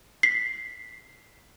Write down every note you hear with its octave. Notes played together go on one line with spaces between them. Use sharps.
B6 C7